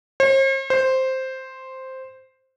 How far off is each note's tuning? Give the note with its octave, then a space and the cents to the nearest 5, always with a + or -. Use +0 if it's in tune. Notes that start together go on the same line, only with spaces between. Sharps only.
C5 +45
C5 +0